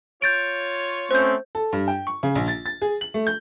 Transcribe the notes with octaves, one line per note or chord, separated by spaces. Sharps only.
F4 C#5 G6 A6 D7
A3 C4 C#4 C5 G6
A4
G2
G5
C#6
C#3
A#1
A6
A6
G#4
F#7
A3
G6